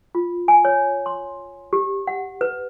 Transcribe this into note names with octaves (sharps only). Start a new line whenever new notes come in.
F4
G#5
C#5
C6
G4
F#5
B4